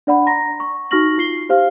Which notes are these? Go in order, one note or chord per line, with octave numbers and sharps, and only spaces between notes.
D4 D5 F#5 B5
A#5 C6 A#6
C#6
D#4 F#4 C#6 F6 A#6 F#7
F4 C7 G7
G4 C5 F5 F6